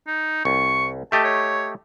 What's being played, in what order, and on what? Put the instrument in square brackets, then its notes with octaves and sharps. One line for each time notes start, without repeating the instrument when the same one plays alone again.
[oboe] D#4
[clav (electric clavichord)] C2 [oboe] C#6
[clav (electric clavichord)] A3 G4 D#5 [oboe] A5
[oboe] C#5